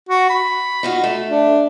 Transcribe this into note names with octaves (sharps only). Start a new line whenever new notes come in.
F#4
B5
D#4 F4 F#4
A3
D4